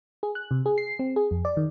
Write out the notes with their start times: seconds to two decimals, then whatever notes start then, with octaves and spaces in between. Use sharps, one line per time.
0.23 G#4
0.35 F#6
0.51 C3
0.66 G#4
0.78 C7
0.99 C4
1.16 G#4
1.31 F2
1.45 D5
1.57 D#3